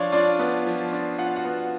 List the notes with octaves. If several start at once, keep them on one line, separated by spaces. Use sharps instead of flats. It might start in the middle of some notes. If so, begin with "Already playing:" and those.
Already playing: F3 D4 F4 C#5 D5 F5
D4 F4 D5
B3
F3
D4
F4 F#5
F5
F#4 F#5
B3